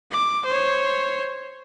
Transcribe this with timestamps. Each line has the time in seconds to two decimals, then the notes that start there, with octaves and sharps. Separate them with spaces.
0.11 D6
0.46 C5 C#5